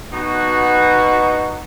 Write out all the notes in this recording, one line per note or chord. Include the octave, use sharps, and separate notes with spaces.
B2 D#4 F#4